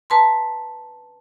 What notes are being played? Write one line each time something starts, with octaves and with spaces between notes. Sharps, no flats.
B4 A5 A#5 C6